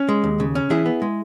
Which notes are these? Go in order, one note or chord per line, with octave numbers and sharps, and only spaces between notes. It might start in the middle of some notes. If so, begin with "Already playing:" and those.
Already playing: C#4
G#3
D#2
C#3
C#4
E3 E4 G#4
B3
G#3